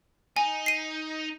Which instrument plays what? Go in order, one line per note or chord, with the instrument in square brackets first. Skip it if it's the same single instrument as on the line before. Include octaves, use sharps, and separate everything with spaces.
[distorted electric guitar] D#4 [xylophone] G#5
[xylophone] C7 D#7